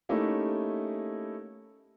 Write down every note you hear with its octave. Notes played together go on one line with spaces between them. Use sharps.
A3 A#3 C#4 D#4 E4 G4